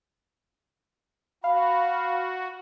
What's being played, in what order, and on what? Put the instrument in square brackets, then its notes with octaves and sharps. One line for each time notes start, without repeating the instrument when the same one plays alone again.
[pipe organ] F#4 [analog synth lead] F5 [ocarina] B5